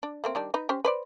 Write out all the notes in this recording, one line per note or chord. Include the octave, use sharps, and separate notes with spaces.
D4
A3 A#3 C4
D#3 G3 D4
D#4 B4
C#4 G4 C5
B4 C5 D5